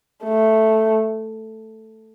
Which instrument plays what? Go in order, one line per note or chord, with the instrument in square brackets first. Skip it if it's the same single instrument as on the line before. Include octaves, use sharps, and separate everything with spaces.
[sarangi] A3